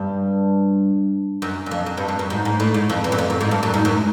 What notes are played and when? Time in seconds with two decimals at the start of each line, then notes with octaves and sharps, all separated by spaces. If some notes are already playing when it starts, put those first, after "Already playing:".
Already playing: G2
1.42 F#2
1.66 F#2
1.71 F2
1.86 F#2
1.97 G2
2.08 G2
2.19 F#2
2.30 G#2
2.45 G#2
2.60 A2
2.74 G#2
2.90 F2
3.04 E2
3.12 F#2
3.19 F2
3.30 F#2
3.41 G#2
3.51 G2
3.63 F#2
3.74 G#2
3.85 F#2